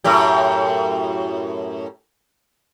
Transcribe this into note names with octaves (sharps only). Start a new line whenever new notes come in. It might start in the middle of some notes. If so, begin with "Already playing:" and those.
F#2 A2 G4